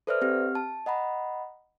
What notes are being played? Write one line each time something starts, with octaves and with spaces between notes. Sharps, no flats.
A4 B4 C5 D5 E5 F6
C4 G4 F6
A5
D#5 F#5 A#5 B5